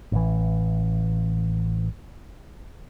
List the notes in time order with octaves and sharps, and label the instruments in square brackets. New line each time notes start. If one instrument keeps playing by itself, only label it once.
[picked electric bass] A1 E3